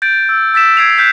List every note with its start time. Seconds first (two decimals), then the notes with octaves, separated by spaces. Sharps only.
0.02 G6 A6 D7
0.29 E6
0.54 E6 A6 B6 E7
0.77 G#6 C7 D7 F7
0.98 F#6 G6 B6